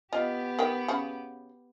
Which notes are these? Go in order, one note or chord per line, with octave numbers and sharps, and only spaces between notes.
B3 F4 G4 D#5
D#3 G5
C#3 F#4 B5